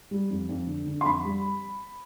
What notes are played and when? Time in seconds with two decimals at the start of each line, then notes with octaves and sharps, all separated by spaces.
0.11 G3
0.30 F2
0.49 F2
0.67 D3
0.86 D3
1.01 C6
1.05 F2 B5
1.24 G3